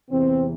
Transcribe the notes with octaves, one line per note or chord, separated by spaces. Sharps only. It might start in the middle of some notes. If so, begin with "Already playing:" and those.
E2 C3 E3 C4